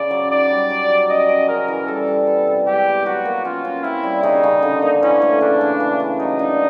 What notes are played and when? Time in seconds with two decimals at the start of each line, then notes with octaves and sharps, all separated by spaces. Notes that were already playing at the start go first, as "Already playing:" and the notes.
Already playing: C#3 D5
0.11 F#3
0.31 D#4 D5
0.50 G3
0.70 F#3
0.89 F#3
1.09 C#4 D#5
1.29 C#4
1.48 C#3 A#4
1.68 E3
1.87 G3 A4
2.08 G3
2.27 B3
2.47 C3
2.66 G#3 G4
2.86 B3
3.06 F#3 F#4
3.25 A#3
3.45 C#4 F4
3.65 C#4
3.84 C4 E4
4.03 G3
4.23 C#3 D#4
4.43 C#3
4.63 D3
4.82 A#3
5.02 E3 C#4
5.22 A3
5.41 C#3 D4
5.61 C#3
5.80 E3
6.00 E3
6.20 F#3 D#4
6.39 D4